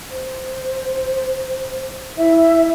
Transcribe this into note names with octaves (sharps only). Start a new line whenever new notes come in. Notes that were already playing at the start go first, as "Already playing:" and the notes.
C5
E4 E5